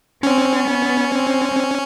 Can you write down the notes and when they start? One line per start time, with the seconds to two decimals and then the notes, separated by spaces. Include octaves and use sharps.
0.23 C4 C#4
0.69 B3
1.14 C4